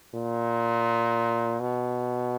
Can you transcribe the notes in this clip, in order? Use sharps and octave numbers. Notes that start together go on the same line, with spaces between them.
A#2
B2